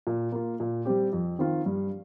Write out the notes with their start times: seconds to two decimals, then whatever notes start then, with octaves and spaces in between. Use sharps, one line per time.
0.07 A#2
0.32 A#3 F4
0.60 A#2
0.85 G3 C4 G4
1.13 F2
1.39 D#3 C4 F4
1.66 G2